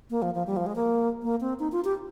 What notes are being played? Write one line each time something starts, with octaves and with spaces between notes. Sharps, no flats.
A#3
F3
F3
G3
F3
G#3
A#3
A#3
C4
D#4
F4
G4